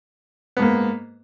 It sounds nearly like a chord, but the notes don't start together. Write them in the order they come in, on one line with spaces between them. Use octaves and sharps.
B3 G#2 A#3